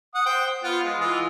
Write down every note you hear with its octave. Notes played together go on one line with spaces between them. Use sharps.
F#5 D#6
C5 G5
B3 F4 F#5
G#3
E3 G#3 F4